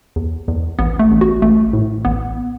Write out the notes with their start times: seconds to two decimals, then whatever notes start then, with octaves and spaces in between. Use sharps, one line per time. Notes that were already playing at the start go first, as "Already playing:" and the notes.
0.16 E2
0.48 E2
0.79 A1 B3
0.99 A3
1.11 A1
1.21 F#4
1.42 A1 A3
1.73 A2
2.05 A1 B3